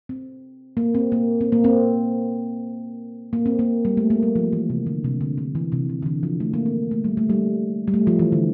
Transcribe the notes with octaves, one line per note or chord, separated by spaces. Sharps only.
C4
A#3
C4
A#3
C4
A#3
C4
A#3
C4
A#3
G3
A3
A#3
G3
F3
E3
C3
D3
C3
D3
D3
E3
C3
D3
D3
E3
F3
A3
A#3
C4
A3
G3
A3
G3
G3
A3
F3
E3
D3